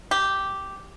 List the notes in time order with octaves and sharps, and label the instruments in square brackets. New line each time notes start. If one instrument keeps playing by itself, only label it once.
[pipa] G4